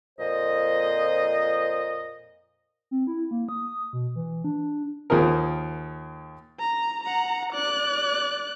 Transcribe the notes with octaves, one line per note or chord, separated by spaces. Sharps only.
F2 A#2 C5 D#5
C4
E4
A#3
D#6
B2
E3
D4
D#2 F3 G#4 A#4
A#5
F#5 A#5
D5 F#6